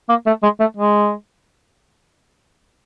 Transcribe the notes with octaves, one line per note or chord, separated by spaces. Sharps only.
A#3
A3
G#3
A3
G#3